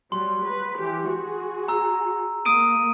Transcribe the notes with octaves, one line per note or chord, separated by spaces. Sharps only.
F#3 G3 C6
B4
E3 G4
F#4 G#4
A#5 E6
A#3 D#6 D7 D#7